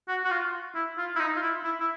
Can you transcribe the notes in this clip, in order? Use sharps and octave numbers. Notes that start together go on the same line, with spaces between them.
F#4
F#4
F4
E4
F4
E4
D#4
F4
E4
E4
E4